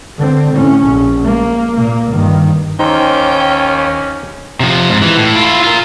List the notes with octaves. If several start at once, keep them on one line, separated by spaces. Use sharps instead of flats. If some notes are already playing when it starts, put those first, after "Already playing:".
D3 C4
A2 C#4
A#1
A#3
A#2 A#3
G2 D#3
D#2 C#4 D#4 C5 G5 A#5
C3 F3
G#2
E3
A2
E4 F4
F4 A#4